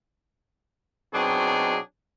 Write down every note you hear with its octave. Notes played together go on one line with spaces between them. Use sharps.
B2 F#3 C4 D4 D#4 G#4